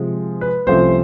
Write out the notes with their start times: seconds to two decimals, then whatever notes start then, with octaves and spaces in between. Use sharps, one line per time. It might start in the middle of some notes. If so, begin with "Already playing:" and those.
Already playing: C3 F3 G#3
0.41 B4
0.66 C2 C3 F3 A3 C#4 C5